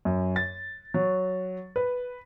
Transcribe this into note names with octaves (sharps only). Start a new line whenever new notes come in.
F#2
A6
F#3
B4